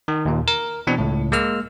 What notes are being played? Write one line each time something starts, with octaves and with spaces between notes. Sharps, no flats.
D#3
D#2 A#2
A#4
B2 E3 C4 D4
C#2 A2
G#3 A#3 E6 F6